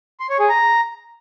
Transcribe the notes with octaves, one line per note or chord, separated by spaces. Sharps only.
C6
C#5
G#4
A#5